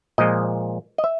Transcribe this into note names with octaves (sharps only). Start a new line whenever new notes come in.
A#2 F3 G#3 D#5
D#5
E5